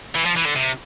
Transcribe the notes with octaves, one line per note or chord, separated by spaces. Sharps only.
E3
F3
E3
D3
C3